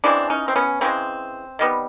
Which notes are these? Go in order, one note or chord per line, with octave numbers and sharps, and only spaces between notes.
C#3 E3 G#3 C4 D4
C#4 D#4
C4
B3 C#4
C#3 E3 G#3 C4
D#3 G3 B3